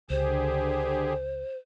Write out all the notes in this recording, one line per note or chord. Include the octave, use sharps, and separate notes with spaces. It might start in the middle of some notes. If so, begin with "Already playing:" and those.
C#2 D3 G4 G#4 C5